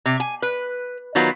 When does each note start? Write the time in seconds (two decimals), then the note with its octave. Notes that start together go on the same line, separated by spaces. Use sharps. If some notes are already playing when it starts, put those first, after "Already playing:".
0.06 C3
0.20 G#5
0.42 B4
1.15 D#3 F#3 B3 F4